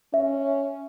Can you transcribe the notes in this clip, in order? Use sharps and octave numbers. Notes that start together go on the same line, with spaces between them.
C#4 E5